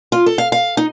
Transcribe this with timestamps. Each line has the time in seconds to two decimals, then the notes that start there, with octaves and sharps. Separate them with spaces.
0.12 F4
0.26 A4
0.38 F5
0.52 F5
0.77 D#4